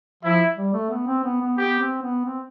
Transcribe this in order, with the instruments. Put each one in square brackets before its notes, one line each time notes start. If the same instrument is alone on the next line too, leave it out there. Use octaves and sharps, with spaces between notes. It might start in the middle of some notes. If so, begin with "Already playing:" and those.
[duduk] F3 [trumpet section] E4
[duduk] G3
A3
B3
C4
B3
B3
[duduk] B3 [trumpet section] G4
[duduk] C4
B3
C4